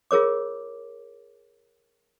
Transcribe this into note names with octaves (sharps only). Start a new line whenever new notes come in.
F4 G#4 A#4 C#5 D6